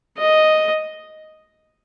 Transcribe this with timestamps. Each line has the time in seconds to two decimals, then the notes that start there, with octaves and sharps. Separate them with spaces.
0.18 D#5